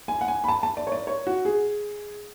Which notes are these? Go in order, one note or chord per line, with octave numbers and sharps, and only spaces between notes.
G#5
F#5
G#5
B5
A5
A5
D5
C#5
D5
C#5
F#4
G#4